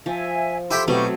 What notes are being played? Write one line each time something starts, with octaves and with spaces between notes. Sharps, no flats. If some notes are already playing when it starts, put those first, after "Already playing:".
F3 E5 G#5
E4 G4 A4 G5 C6
B2 F#3 A3 C4 E4 G4 C#6